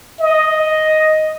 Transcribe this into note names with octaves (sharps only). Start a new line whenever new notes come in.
D#5